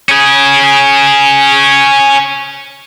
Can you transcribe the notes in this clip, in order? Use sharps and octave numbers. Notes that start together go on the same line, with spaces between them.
C#4 G#4